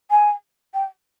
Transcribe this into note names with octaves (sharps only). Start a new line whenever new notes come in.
G#5
G5